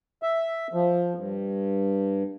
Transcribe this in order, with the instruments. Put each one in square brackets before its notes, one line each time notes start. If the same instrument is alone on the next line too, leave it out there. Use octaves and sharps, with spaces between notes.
[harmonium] E5
F3
G2